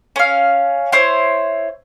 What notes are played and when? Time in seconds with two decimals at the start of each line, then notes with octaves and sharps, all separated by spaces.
0.16 C#4 F5
0.92 E4 C5 C#5